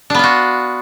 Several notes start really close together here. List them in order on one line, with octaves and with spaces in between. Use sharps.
D4 B3 F4 F#4